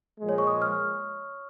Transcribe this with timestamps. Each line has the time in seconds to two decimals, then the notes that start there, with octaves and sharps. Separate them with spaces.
0.19 A#2 F3 G#3
0.29 C#5
0.38 C#6
0.47 D#6
0.62 F6